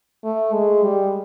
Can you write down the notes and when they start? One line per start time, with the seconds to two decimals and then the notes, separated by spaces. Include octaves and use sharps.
0.24 A3
0.54 G#3
0.84 G3